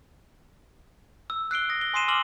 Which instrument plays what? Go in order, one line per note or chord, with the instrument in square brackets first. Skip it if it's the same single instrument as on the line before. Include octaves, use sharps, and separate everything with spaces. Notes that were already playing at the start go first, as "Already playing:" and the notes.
[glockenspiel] E6
F#6 C7 D7 G7
D#6 A#6
G7
G#5 C6 D#6 C7 D#7 E7
D6 E6 F6 F#7 G7